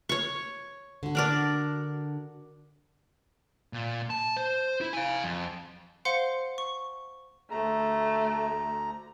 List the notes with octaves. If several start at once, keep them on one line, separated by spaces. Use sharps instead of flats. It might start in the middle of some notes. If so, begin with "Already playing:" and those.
C#5 C#6
D3 F#4
D4 A#4 D5
A#2
A5
C5
E4
F5 G#5
F2
C5 F5 F#5 C6 C#7
C#6
D2 A3 A#5